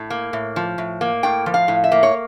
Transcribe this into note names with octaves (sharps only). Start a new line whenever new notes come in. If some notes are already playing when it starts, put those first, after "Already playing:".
Already playing: A2
A#3
A2
F3
A2
A#3
A2 G5
F3
F5
A2
E5
A#3
C#5